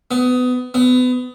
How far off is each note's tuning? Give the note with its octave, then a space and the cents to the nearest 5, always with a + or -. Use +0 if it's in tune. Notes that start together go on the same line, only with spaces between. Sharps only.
B3 +25
B3 +30